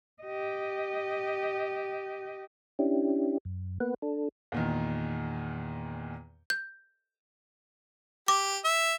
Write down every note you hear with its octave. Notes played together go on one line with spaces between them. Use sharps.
G4 D#5
C#4 D4 E4 G4
F#2
A#3 B3 B4 F#5
D4 A4
E2 A#2 D#3
G6
G4 D6
E5